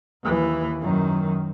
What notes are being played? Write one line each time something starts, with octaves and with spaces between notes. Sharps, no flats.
D#2 E3
F#2 D#3